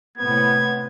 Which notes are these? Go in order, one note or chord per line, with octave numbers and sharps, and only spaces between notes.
A2 C3 B3 G#6